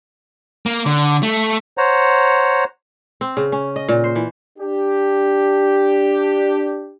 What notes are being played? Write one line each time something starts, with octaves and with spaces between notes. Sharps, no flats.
A#3
D3
A3
C5 C#5 F#5 A#5
C4
C#3
C#4
D#5
A#2
C5
E3
D4 G4